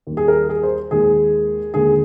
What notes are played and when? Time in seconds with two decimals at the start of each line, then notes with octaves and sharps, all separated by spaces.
0.07 D#2 D#3 G3
0.17 G#4
0.28 A#4
0.49 G#4
0.63 C5
0.91 D#2 D#3 G#3 G#4
1.74 D#2 D3 G#3 G#4